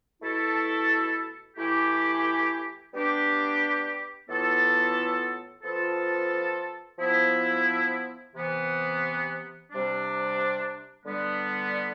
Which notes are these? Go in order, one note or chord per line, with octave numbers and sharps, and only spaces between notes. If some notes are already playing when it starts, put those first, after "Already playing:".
B2 A3 E4 A4
E3 A3 E4 G4
G3 B3 D4 G4
A2 E3 B3 F4 A4
F3 B3 F4 A4
F3 B3 E4
C3 E3 B3
C3 G3 D4
D3 G3 B3